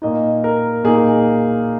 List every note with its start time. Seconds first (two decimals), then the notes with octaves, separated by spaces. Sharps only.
0.02 A#2 A#3 D#4 D#5
0.44 A#4
0.84 A#2 A#3 D#4 G#4